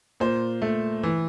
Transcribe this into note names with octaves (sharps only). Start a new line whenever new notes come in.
A#2 C5
A3
E3